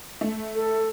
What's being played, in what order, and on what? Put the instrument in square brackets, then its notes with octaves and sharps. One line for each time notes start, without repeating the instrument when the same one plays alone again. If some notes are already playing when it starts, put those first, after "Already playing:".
[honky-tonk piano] A3
[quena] A4